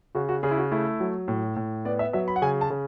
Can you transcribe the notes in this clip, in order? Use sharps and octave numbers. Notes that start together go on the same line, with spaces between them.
C#3 F#4
F#4
C#3 G#4
E4
F#4
A3 E4
F#3
A2
A2
B3 D5
E5
F#3 E5
B5
F#5
C#3 G#5
A5
C#3